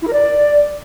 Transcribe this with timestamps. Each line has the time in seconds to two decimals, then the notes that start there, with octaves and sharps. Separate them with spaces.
0.02 E4
0.07 A#4
0.13 D5